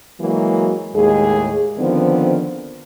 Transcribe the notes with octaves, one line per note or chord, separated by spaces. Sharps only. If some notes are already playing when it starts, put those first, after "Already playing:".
E3 F#3 G#3 A#3 F#4
D#2 A2 G#3 G#4
D3 D#3 F3 B3 C4